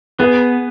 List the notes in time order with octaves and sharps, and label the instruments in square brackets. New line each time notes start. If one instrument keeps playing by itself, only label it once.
[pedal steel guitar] B3 [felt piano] G#4 B4